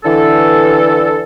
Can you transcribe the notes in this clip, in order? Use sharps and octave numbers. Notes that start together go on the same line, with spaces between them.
D3 E3 A4